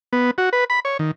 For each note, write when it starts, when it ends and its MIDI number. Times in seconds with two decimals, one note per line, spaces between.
0.13 0.31 59
0.38 0.49 66
0.53 0.64 71
0.70 0.80 83
0.85 0.97 73
0.99 1.11 51